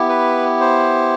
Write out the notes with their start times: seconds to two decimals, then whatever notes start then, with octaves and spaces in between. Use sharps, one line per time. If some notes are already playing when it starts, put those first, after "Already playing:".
Already playing: B3 E4 G4
0.09 B4
0.60 C5